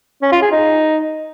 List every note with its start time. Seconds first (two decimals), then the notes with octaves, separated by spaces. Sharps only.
0.22 C#4
0.32 F4
0.42 G#4
0.52 D#4